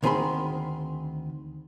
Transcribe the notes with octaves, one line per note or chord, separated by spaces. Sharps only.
D2 D#3 C4 G#4 B5 C6